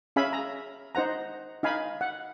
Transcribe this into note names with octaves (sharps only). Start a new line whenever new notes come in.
C#4 G#4 E5 F5 G#5 B5
A#5
D#4 C5 F#5 A#5
D#4 F5 G#5 B5
F#5